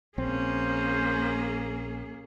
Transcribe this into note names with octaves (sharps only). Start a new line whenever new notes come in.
A#1 A#3 C4 C#4 G#4 C5